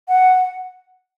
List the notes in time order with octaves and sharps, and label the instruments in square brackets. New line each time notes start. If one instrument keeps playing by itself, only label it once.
[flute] F#5